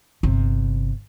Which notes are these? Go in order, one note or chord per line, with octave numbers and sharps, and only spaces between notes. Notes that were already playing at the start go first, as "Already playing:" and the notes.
G1 C3